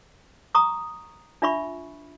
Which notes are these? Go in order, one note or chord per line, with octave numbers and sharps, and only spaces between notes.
A#5 C#6 D#6
D4 F4 E5 B5 C#6